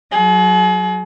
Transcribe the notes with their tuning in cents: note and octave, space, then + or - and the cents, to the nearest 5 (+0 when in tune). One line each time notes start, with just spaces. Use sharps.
F#3 +0 G#4 +40